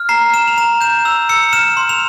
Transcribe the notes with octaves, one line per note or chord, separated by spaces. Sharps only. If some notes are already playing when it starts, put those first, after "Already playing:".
Already playing: F6
A#5 C7
F6 E7
F7
A#5 E7
G6 E7
E6 F7
E6 C#7
F6 E7
C6
F7